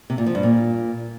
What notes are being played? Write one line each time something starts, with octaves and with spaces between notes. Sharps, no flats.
C3
A#2
F3
G2
A#2